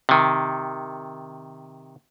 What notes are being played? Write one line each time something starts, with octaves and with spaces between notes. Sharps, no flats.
C3 D#3